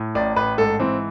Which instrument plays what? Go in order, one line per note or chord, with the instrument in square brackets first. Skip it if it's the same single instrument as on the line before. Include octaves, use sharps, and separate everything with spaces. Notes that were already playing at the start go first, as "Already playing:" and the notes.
Already playing: [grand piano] A2
A1 D5
A1 B4
G#2 A4
E3 C4